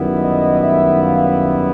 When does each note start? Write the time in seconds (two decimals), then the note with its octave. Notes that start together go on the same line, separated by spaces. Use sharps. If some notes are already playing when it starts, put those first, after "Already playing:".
Already playing: F#2 D#3 G3 B3 E4
0.18 D#5
0.60 E5
1.02 F5